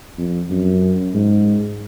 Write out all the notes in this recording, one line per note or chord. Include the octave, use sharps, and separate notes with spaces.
F2
F#2
G#2